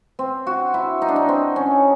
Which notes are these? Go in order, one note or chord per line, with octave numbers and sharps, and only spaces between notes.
C4
F#4
E4
D#4
D4
D#4
C4
C#4